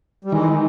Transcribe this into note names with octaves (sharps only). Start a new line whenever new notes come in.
G3
D#3 E3 G#3